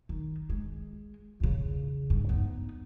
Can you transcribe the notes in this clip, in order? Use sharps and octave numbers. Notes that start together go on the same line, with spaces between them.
D#3
G#3
E2 C#3
G2
B3 D#4